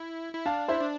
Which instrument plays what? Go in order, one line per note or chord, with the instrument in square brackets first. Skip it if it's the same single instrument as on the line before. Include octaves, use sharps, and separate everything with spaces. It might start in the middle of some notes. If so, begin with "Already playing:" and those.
Already playing: [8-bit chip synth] E4
E4
[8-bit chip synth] D4 [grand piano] F5 A5
[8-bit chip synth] E4 [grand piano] C5 E5
[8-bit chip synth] D4